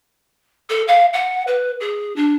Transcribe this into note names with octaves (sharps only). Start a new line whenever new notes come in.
A4
F5
F#5
B4
G#4
D4